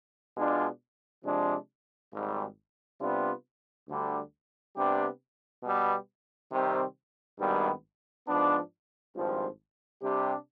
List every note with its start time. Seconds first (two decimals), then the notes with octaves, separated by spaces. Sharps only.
0.36 B2 G#3 D4 F4
1.25 C3 F3 G#3 D4
2.13 G#1 G#2 G3
3.00 C3 G3 B3 D4 F4
3.87 D2 D3 G3
4.75 C3 G3 B3 D4 G4
5.63 B2 G3 B3
6.52 C3 D#3 G3 C4
7.39 G#1 G2 D#3 G3 B3
8.27 G#2 F3 B3 D4
9.15 G#1 G2 F3
10.03 C3 G3 D4 G4